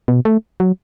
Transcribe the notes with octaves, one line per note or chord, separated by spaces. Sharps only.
B2
A3
F#3